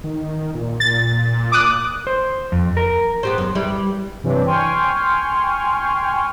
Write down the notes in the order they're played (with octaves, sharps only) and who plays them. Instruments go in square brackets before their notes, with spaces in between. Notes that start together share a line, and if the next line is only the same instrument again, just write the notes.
[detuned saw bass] D#3
A#2
[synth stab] A6
D6 D#6 F#6
[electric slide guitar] C5
F2
A#4
[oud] B3 G4 C5
F#2
G3 E4 B4
[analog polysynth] G2 C3 E3 F#3 D4
G5 G#5 C6 C#6 F6